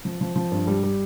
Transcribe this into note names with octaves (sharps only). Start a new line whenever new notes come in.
F3
F3
F3
G2
G3
G3